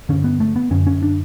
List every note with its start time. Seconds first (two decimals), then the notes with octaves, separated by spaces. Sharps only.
0.09 G2 D3 C#4
0.24 B3
0.40 A3
0.56 B3
0.71 F#2 D3 C#4
0.87 C#4
1.03 D4